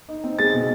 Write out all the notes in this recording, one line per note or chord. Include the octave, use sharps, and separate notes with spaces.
D#4
C4
G#3 A6
B2